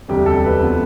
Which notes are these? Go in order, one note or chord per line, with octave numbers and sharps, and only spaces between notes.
E1 D2 C3 G3 G4
A4
B4
C3 F3 B3